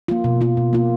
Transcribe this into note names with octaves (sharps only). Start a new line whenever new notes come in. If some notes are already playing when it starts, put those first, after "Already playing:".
A#3 F4
B2
A#3 F4
B2
A#3 F4